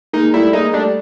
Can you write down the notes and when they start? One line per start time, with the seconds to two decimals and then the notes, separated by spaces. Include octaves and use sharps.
0.13 G#3 A#3 D#4
0.34 G3 A3 E4
0.53 G#3 A#3 D#4
0.73 G3 A3 D4